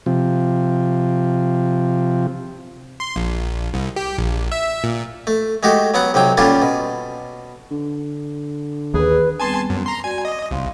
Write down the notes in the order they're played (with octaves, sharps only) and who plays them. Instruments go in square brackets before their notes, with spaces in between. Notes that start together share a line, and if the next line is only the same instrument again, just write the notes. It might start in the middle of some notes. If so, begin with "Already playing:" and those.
[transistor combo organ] C3 F3
[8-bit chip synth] C6
A#1
C2
G4
A#1
E5
A#2
[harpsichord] A3
G#3 A3 F#4 G4
F#3 B3 F#5
B1 C3 F#3 G5
A#2 D3 G3 C#4 D4 F4
B2
[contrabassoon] D3
[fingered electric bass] D#2 [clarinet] G#4 [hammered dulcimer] B4
[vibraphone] G3 B3 C4 [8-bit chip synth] G#5 A5 C6
[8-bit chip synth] F#2
A#5 C6
[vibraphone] F#4 D5 [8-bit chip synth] G#5
[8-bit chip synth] D#5 [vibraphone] D6
[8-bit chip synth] C2 [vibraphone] F5 C6